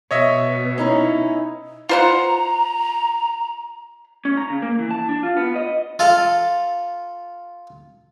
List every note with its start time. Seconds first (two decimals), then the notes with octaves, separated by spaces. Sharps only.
0.11 B2 C#5 D#5 E5
0.78 C#4 D#4 E4
1.89 F4 C5 F#5 A#5
4.25 C#4
4.37 A#5
4.50 C#3
4.62 A#3
4.79 E3
4.91 A5
5.09 D4
5.23 F4
5.37 B3
5.56 D#5
5.99 F4 A4 F5